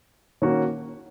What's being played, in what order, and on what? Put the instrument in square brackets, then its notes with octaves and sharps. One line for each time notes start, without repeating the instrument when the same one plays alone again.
[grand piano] D#3 A#3 C#4 F#4